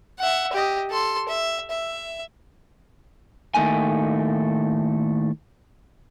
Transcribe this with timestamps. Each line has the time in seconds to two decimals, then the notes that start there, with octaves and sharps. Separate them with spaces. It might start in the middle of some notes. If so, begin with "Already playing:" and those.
0.20 E5 F#5
0.53 G4 D#5
0.91 A4 C6
1.29 E5
1.70 E5
3.54 A2 D#3 A3 A#3 D#4 G#5